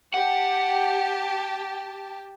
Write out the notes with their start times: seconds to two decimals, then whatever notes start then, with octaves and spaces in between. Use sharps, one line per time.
0.14 G4 F#5 A5